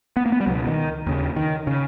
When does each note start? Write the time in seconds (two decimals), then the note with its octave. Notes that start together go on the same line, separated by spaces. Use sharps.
0.17 B3
0.26 A#3
0.32 B3
0.41 G3
0.46 C#2 F#3
0.51 B2
0.67 D#3
1.06 D#2 C#3
1.36 D#3
1.67 C#3